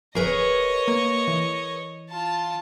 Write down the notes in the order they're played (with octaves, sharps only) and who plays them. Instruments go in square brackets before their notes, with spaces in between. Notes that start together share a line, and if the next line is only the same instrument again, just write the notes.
[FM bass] D1 [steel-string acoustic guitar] G#4 A#4 B4 [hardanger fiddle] C#5 D#5
[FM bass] A#3
E3
[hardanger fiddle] F4 A5